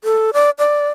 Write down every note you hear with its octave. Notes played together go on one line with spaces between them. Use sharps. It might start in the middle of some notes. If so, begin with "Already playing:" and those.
A4
D5
D5